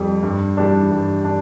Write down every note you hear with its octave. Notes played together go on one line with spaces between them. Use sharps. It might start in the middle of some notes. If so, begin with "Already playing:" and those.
Already playing: F2 G3
G2
E3 G3 D4
G2
D4